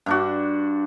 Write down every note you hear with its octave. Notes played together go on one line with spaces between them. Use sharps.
G2 D4 F#4